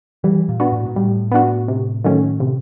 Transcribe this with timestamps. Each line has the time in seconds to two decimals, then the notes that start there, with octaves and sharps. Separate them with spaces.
0.24 E3 G3
0.49 A#2
0.60 B3 D4 F#4
0.72 A2
0.86 G#2
0.96 A2 G3
1.32 B3 D4 F#4
1.68 C3
2.04 D#3 F#3 A3 C#4
2.40 C3